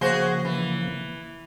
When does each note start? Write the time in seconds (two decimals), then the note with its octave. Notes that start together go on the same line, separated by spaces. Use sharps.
0.01 C#3 F3 A#3 F#4 G#4 C5
0.45 E3